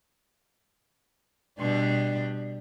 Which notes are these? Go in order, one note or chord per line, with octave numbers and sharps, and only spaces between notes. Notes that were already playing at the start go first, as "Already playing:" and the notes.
B2 G3 D4